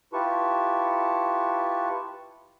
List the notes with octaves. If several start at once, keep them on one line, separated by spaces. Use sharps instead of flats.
E4 F4 G4 B4 A5 C#6